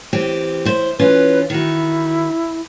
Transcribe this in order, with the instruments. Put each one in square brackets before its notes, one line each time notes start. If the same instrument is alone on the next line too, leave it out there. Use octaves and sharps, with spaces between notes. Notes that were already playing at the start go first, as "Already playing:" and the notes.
[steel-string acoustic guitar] E3 C4 G4
E4 C5
[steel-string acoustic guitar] E3 C#4 F4 [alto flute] B4
[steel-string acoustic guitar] D#3 F#4 [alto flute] E4